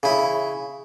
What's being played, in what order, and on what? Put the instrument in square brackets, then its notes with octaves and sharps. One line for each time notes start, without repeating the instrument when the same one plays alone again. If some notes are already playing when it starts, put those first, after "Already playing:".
[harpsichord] C#3 E4